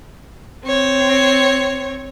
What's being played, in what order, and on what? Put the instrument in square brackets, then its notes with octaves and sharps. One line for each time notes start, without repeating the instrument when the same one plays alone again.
[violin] C4 C#5